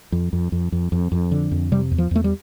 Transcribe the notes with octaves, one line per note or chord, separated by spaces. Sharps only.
F2
F2
F2
F2
F2
F2
D3
F2
C3 G3
E2
F3
E2 A3
G3